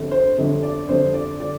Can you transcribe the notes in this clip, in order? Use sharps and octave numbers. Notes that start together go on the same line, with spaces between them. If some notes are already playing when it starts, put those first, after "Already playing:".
Already playing: G1 F2 D3 G3
C5
G1 F2 D3 G3
D5
G1 F2 D3 G3 C5
D5
D3 G3 D5